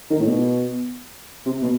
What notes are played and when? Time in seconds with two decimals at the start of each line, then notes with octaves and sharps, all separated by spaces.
0.10 D#3
0.19 A2
0.27 B2
1.46 C3
1.62 B2